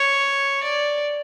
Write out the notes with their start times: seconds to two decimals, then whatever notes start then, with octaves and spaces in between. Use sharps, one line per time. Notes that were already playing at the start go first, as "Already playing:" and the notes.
Already playing: C#5
0.63 D5